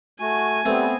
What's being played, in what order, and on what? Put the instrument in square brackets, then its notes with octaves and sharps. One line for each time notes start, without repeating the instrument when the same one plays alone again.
[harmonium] A3 F#4 [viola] G#5
[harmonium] G3 [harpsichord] A3 [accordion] B3 C4